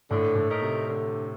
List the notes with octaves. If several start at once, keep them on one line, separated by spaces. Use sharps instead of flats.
A2 D3
A2
A3 D#4 A#4
C3
D3